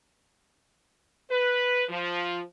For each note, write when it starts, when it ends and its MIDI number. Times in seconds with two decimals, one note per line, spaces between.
1.30 1.84 71
1.89 2.40 53